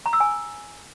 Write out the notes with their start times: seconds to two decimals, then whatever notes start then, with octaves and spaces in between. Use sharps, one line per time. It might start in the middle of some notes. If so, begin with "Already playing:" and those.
0.06 A#5
0.13 E6
0.20 G#5